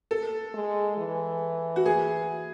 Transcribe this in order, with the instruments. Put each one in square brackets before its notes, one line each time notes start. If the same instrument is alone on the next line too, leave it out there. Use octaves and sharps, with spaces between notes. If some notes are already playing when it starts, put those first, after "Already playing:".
[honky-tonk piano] A4
[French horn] G#3
E3
[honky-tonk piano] F#4
G#4